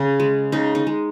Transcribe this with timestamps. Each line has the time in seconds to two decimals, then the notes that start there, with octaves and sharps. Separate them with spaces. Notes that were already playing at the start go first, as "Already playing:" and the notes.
Already playing: C#3
0.20 G#3
0.52 C#3 D#4
0.75 D#4
0.87 G#3